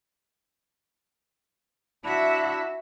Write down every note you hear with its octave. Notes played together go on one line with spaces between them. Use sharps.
D4 E4 F#4 E5